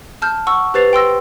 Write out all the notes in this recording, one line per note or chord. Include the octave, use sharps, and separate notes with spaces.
A5 F6 G6
F#5 C#6 E6
G4 B4 C5 A6 C7 F7
G5 C6 E6 A#6